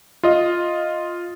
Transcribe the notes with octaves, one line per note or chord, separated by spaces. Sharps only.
F4 D#5